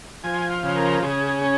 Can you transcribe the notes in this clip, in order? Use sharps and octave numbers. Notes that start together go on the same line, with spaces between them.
F3 G#5
F5
C#3
A#4
C#3 G#4
C#4